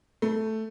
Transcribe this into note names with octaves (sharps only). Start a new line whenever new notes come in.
A3